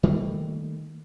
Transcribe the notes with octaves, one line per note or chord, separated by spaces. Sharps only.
D#3 G3 A3 A#3